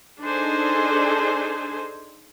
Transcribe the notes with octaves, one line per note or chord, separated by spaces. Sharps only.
D4 D#4 G#4 A4 C5 G#5